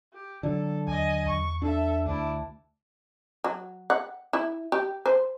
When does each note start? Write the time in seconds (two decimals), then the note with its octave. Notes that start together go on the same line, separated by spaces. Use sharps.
0.14 G4
0.43 D3 F#3 A4
0.87 D#2 D#5 G#5
1.29 E2 C#6
1.62 D4 A4 E5
2.06 D2 D4 E4
3.44 F#3
3.90 F#5
4.33 E4
4.72 G4
5.06 C5